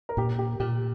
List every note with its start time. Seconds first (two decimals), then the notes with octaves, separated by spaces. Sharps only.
0.09 A#4
0.17 A#2 G4
0.39 G4
0.60 A#2 G4